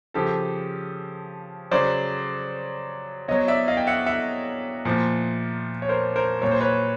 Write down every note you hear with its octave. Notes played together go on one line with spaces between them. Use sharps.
C#3 F3 G4 A4
C#3 F#3 C5 D5
B2 F#3 C#5 D#5
D5 E5
D#5 F5
G5
E5 F#5
E5 F#5
A#2 F3
C#5
A#4 C5
A#4 C5
A#2 F#3 C#5
C5
B4 C#5